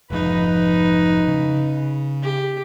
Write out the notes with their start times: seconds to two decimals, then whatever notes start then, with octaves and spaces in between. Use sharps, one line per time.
0.10 F1 G#2 F3 D#4 B4
1.28 C#3
2.23 G4